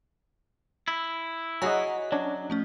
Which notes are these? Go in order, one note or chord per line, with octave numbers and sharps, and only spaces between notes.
E4
F#4 G#4 C#5 D#5 F#5 G#5 A#5
F#3 C#4 D4
F3 A3 C#4